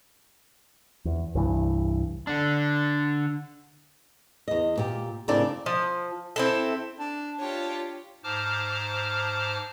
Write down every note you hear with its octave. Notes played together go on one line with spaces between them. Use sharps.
E2
C2 G2 E3
D3 D4
E2 D#5
A#2 G4
A2 C#3 A#3 C4 D4 D5
F3
C4 E4 A4
D4
D4 F4 G4 C#5
G#2 C5 A5 A#5 D6 F6